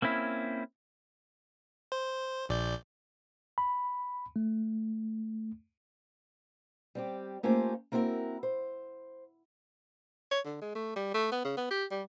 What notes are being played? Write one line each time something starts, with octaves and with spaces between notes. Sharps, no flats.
A#3 C4 C#4 E4
C5
A#1 D5 G6
B5
A3
G3 C4 G4
A3 A#3 C#4 F4 G4 C5
A#3 C4 E4 F#4 G#4 A#4
C5
C#5
D3
G#3
A3
G3
A3
B3
C#3
B3
G4
G3